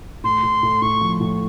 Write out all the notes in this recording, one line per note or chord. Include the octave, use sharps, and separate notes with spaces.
A2 C6
A2
A2
A2 C#6
F3
A2